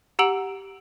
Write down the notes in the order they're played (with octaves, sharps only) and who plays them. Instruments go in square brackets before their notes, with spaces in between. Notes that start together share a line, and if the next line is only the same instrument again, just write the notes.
[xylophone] G4 F#5 A#5 E6 D7 F#7